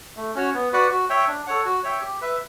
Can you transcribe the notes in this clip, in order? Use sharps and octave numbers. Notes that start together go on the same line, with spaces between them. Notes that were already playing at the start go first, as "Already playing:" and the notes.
A3
C#4 F#4 C#5
B3
F#4 B4 D5 F#5
F#4
C#5 E5 G5
D4
A4 C#5 F#5
F#4
C#5 E5 G5
G4
B4 E5